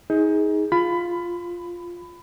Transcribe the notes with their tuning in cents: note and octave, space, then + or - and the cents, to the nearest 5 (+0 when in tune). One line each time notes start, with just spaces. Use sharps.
D#4 +30 G#4 +0
F4 +0 B5 +20